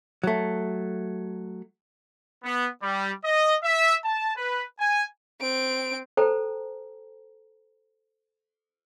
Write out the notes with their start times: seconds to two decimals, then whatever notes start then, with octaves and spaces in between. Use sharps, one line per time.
0.23 F#3 A3
2.44 B3
2.83 G3
3.24 D#5
3.63 E5
4.05 A5
4.37 B4
4.80 G#5
5.41 C4 D7
6.17 A4 C5 G5 A5 A#5